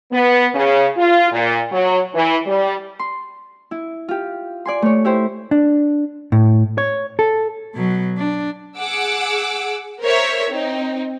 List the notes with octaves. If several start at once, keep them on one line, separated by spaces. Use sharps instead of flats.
B3
C#3
F4
A#2
F#3
E3
G3
C6
E4
F4 G4
D5 G#5 C6
A3 C#5
E4 G4 C5
D4
A2
C#5
A4
B2 F#3
D4
G#4 F#5 D6 E6
A#4 C5 C#5 E5
C4 D#4